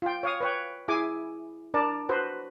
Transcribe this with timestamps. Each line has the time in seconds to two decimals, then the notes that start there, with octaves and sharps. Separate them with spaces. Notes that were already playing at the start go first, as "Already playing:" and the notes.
0.02 F4 G5
0.23 C#5 F5 D#6
0.41 B4 C#5 G5
0.88 E4 G#4 G#5 D6
1.74 D4 A#4 D5 A5
2.09 F#4 B4 C5